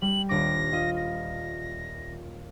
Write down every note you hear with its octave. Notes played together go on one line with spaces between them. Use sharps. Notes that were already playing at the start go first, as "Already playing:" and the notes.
G3 F#7
D#1 D4 D6 A#6
F4 D#5
A#6